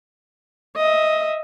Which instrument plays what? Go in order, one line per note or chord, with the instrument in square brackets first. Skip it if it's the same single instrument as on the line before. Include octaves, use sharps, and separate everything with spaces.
[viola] D#5 E5